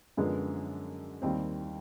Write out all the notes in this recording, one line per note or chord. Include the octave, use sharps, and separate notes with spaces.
F#2 D3 F3 G#3 B3
D#2 D#3 G3 C4